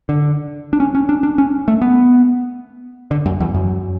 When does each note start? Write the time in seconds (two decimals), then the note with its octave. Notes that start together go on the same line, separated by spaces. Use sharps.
0.09 D3
0.73 D4
0.80 C#4
0.95 C#4
1.09 D4
1.23 D4
1.38 C#4
1.68 A3
1.82 B3
3.11 D3
3.26 F#2
3.40 E2
3.55 F#2